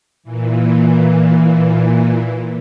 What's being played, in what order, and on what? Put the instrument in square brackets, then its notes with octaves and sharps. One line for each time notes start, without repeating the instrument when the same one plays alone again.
[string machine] A#2 E3